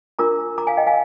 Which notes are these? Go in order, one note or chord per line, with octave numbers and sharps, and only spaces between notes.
D4 F4 A#4 A#5 D6
A#5 D6
F5 G#5
D#5 G5
F5 G#5